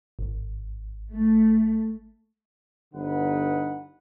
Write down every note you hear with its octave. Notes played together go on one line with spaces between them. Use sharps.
G#1
A3
G1 D3 D#4 B4 F#5